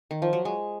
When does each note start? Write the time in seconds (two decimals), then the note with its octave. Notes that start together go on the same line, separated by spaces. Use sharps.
0.11 D#3
0.22 F3
0.33 F#3
0.45 G#3